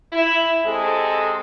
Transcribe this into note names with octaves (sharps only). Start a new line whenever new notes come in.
E4
C3 G#3 C4 A4